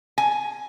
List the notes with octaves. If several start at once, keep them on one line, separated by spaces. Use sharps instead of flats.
G#5